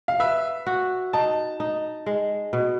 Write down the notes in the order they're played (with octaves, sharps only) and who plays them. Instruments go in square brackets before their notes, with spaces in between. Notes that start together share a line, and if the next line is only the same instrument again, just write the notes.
[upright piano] F5
[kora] B4 [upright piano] E5
[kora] F#4
[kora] D#4 [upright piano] A5
[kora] D#4
G#3
B2